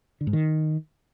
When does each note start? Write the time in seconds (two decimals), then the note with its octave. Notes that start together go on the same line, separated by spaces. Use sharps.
0.21 D3
0.27 G#2
0.33 D#3